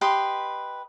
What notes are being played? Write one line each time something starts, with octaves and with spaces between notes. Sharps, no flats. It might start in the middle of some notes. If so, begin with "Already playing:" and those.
G4 B4 D#5 C6